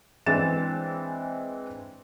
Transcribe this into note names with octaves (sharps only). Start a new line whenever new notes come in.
E3 G#3 C4 D4 A6 E7